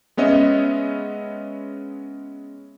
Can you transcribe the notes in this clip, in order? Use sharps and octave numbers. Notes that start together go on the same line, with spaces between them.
G#3 B3 C#4 D#5 E5